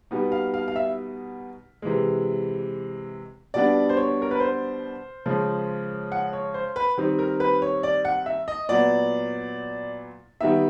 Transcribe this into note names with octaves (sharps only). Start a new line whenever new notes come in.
B2 G3 B3 D#4
F5
F5
F5
E5
C3 E3 G#3
B2 G3 B3 D4 D5
C5
C#5
A#4
B4
C5
C#3 F3 G#3
F#5
C#5
C5
B4
D#3 G3 C4 D#4
A#4
B4
C#5
D5
F#5
E5
D#5
A#2 F#3 B3 D5
D#3 G3 B3 D#4 E5